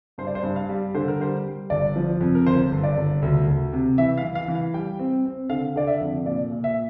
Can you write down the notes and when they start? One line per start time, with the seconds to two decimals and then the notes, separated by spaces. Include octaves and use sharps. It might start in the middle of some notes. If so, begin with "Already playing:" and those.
0.18 G2 C5
0.27 D5
0.35 C5
0.43 G2
0.56 F5
0.69 G3
0.94 D3 C5
1.08 A#4
1.20 G3 C5
1.45 G3
1.70 G1 D5
1.96 F3
2.20 F2
2.35 A#4
2.46 G1 C5
2.71 G1
2.84 D5
2.97 G1
3.22 D2
3.47 D2
3.73 C3
3.98 E3 E5
4.18 F5
4.23 E3
4.35 F5
4.48 E3
4.55 F5
4.74 G3 G5
4.99 C4
5.25 C4
5.50 D3 F5
5.76 D3 D5
5.87 E5
6.00 F2
6.26 A#2 D5
6.51 A#2
6.64 E5